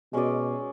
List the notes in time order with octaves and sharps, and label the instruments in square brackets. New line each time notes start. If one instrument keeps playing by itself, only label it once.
[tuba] B2 [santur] G#3 C#4 G#4 D5